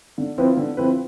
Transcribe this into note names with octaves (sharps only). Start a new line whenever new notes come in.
D3
F3 C4 E4 B4
D3
F3 C4 E4 B4